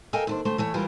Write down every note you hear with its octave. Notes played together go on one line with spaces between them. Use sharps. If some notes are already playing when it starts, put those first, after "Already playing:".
A4 A#4 D#5 F5 G5 G#5
D#2 D4 C5
D2 A3 C5
E3 A3 C#5
E3 G3 F4 A#4